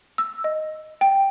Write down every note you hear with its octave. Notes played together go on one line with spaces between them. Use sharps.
E6
D#5
G5